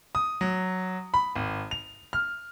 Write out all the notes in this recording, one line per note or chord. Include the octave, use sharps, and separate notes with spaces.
D#6
F#3
B5
G#1
F7
F6